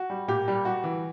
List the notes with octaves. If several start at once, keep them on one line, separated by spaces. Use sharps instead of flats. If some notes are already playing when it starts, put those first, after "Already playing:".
Already playing: F#4
G3
A#2 G4
G3
G3 F#4
E3